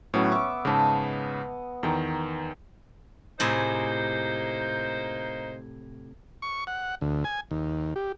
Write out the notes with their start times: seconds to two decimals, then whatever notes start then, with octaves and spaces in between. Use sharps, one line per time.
0.14 A2 F#3 B3 C#4
0.32 E5 C#6 D6
0.65 G#2 C#3 D#5 A5
1.83 E2 D#3 G5 A#5
3.40 A2 C3 A#3 D#4 G#4 C5
6.42 C#6
6.67 F#5
7.01 D2
7.24 G#5
7.51 D#2
7.96 G4